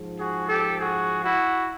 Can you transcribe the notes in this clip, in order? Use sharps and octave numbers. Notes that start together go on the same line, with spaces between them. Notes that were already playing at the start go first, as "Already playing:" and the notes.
Already playing: G#2 F3
F#4 G#4
G4 A4
F#4 G#4
E4 F#4